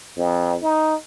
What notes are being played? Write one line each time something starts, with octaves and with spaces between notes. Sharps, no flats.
F2
D#4